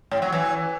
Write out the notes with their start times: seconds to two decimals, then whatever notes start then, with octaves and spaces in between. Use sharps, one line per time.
0.11 A2
0.22 F#3
0.32 E3